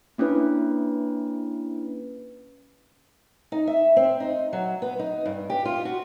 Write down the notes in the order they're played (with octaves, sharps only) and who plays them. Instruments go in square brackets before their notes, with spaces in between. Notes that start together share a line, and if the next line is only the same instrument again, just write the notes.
[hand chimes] A#3 C#4 D4 E4 B4
[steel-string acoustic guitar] D#4
E5
C4
D#4
F#3
B3
D#4
G2
G4
F4
F#4